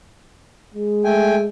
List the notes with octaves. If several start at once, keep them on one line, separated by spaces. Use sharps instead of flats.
G#3
A3 G5 G#5